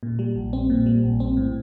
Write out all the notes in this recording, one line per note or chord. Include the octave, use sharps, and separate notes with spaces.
A#2
G3
A#1
C4
A#2
G3
A#1
C4
A2